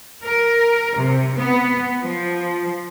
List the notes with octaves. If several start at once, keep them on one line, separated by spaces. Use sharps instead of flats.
A#4
C3
B3
F3